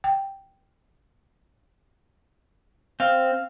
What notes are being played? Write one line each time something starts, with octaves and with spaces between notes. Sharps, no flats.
G5
C4 F5